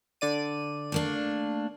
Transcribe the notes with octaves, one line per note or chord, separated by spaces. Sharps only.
D3 D5 D#7
A3 A#3 D4